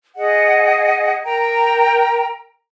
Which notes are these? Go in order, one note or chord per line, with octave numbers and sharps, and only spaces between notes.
G#4 D#5 F#5
A#4 G5 A#5